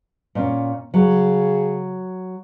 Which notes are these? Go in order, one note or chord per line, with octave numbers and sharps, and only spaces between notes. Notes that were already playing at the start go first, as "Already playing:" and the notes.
A#2 C#4
C#3 F#3